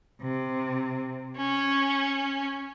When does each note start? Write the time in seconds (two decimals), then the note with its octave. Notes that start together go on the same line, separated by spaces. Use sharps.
0.21 C3
1.37 C#4